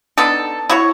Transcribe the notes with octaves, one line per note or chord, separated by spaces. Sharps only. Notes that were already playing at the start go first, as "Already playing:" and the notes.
B3 D4 D#4 A4
E4 F#4 C#5